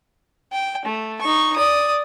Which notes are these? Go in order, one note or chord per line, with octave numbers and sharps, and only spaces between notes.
G5
A3
D#4 C#6
D5 D#6